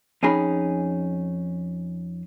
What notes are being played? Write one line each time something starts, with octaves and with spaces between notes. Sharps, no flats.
F2 C#4 D#4 G#4 B5